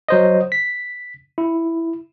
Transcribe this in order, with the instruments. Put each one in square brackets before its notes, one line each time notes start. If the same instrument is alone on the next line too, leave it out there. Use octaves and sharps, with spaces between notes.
[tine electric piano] F#3 C5 D#5
B6
E4